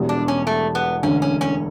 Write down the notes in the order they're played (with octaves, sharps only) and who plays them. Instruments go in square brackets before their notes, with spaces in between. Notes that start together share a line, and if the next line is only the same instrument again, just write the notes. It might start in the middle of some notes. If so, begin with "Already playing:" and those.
Already playing: [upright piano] E1 E2 B2 G3
[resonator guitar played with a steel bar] D4
C#4
A3
B3
[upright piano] E1 D2 D3 [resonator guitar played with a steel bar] C#4
[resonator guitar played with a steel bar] C#4
C#4